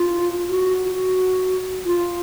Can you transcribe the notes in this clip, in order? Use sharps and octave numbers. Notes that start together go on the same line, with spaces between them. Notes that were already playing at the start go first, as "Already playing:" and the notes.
Already playing: F4
F#4
F#4
F4